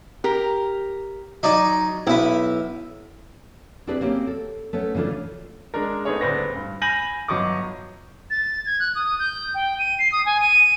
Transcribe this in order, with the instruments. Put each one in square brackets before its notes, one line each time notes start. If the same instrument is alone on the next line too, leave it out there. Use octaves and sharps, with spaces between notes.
[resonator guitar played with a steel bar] G4 A#4
[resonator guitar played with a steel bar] F#3 [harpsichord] D#4 D5 D#5
[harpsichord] B1 B4 [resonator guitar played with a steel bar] E4
[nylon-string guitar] C4 D4 E4 G4 G#4 B4
A#3 C4 C#4 G4
A4
A3 B3 C#4
C#3 E3 A3 D4 F4
[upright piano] G#3 D4 A#4
A3 B3 C4 D#4 G#4 C#5
D#1 D2 B4 C5 D5 A#6
G2
G#5 B5 G6 A#6 D#7 F#7
G1 F#3 D#5 C#6 D6
[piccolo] A6
G#6
F#6
D#6
G6
G5
D#7
C7
D#6
G#5
D#7